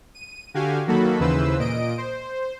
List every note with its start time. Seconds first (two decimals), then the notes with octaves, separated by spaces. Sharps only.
0.15 D#7
0.54 D3 F#4 G4 F5 G#5
0.87 D#3 F#3 A#3 F#4 A4 B5
1.20 D#2 C#3 E3 B4 C5 E6
1.59 A#2 D#5 D7
1.98 C5